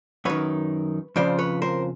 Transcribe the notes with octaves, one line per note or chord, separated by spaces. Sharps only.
F#2 D#3 B4 C#5
F2 C#3 F3 C5 D5
B4 C#5
A#4 C5